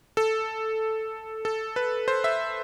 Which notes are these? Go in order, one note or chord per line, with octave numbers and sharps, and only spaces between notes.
A4
A4
B4
C5
E5